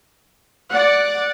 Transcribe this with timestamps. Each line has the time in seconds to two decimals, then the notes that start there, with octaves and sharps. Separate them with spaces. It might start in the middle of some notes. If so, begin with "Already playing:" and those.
0.71 D5 F#5